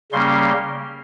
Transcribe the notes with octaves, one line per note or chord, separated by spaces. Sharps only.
C#3 G3 A#3 C#4 C6